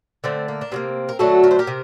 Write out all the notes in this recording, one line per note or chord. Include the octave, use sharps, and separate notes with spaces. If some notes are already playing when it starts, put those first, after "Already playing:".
D3 A3 C4
A#3
D4
C3 F#3 A#3 C4
A#4
D3 F#3 A3 F#4 A4
A#4
C5
G4 A#4
C3